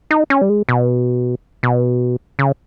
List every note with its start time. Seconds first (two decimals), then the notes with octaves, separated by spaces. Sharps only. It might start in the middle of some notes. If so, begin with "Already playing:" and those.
0.11 D#4
0.30 C#4
0.42 G3
0.49 G#3
0.69 B2
1.63 B2
2.39 C#3